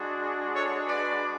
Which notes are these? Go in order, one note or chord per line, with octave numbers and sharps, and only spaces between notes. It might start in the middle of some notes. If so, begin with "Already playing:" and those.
Already playing: G#3 D4 F#4
A4 C#5
B4 D5